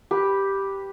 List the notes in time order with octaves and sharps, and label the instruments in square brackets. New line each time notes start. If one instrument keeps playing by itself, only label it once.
[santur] G4 B4